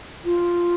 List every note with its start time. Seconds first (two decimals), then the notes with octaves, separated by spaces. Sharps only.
0.25 F4